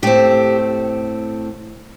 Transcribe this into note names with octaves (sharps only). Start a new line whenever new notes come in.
A2 A3 C4 G4